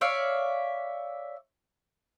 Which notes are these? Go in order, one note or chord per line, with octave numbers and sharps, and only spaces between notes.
C#5 D5 E5 F5